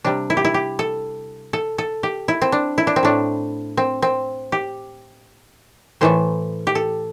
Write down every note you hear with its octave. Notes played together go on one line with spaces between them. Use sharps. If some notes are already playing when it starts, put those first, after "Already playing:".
C3 G3 D4
E4
G4
E4
G4
A4
A4
A4
G4
E4
C4
D4
E4
D4
C4
A2 A3 D4
C4
C4
G4
A2 E3 A3 C5
G4
A4